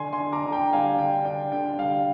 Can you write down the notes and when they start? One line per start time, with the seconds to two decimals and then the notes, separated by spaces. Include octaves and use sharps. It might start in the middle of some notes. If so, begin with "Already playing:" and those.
Already playing: D3 G#5 C6
0.13 G#5 C6
0.20 D4
0.32 A#5 D6
0.46 D3
0.52 G5 A#5
0.73 G3 F5 G#5
0.98 D3 G5
1.25 D4 G5
1.52 D3 G5
1.79 G3 F5